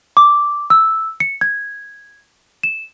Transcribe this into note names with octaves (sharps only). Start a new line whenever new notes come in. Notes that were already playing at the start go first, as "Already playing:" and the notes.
D6
E6
C#7
G#6
E7